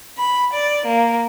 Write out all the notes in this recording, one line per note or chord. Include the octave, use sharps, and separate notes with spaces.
B5
D5
A#3